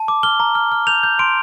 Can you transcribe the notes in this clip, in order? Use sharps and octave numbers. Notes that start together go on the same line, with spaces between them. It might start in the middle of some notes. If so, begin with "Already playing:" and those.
Already playing: A5
D6
F6 G7
A#5
F6
F6
G6 F7
G6
C6 D7